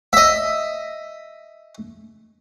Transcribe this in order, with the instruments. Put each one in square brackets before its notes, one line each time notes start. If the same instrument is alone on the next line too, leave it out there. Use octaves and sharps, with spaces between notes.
[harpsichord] D#5 E5